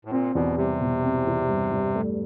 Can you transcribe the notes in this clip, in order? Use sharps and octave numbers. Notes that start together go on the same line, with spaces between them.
A2
A#2 C4
E2 B2
C3 G3
B2
C4
E2
G2
G2
A3